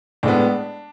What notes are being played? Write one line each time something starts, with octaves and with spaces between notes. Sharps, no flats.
A2 G#3 B3 D4